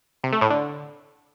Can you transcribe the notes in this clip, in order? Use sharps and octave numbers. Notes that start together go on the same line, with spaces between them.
C3
A3
A2
D3